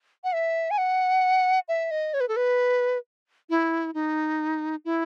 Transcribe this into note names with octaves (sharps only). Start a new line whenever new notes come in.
F#5
E5
G#5
F#5
E5
D#5
C#5
B4
A4
B4
E4
D#4
E4